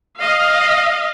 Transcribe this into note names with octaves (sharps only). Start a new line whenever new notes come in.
D#5 F5